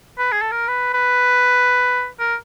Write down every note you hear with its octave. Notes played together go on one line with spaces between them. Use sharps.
B4
G#4
A4
A#4
B4
B4
A#4